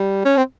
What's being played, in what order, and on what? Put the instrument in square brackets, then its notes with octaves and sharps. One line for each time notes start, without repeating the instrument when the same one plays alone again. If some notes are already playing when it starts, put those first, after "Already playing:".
Already playing: [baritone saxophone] G3
C#4
C4